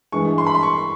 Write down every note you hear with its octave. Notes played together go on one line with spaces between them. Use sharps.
G2 E3 G#3 C#6
C6
B5
C6
C#6